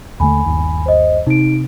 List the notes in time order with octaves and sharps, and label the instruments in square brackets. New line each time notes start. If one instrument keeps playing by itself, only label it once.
[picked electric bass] D#2 D3 A3 [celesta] G#5 B5
[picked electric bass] G1 D#2
[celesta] C5 D#5
[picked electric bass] C3 [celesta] D#4 D7